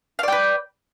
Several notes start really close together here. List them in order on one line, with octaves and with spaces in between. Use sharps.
F5 D5 G5 B4